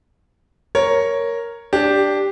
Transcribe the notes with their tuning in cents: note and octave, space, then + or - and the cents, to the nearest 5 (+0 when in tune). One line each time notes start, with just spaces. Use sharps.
A#4 +0 C#5 +0
D4 +0 G4 +0